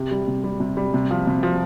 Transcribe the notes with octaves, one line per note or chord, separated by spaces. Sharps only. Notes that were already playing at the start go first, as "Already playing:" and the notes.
Already playing: C3 G4
G3
C3
G3
C3
G3
C3
F3
C3
F3